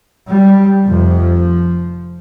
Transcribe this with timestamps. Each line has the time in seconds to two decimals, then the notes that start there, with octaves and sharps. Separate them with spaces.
0.30 G3
0.84 F1 F2 C3 F3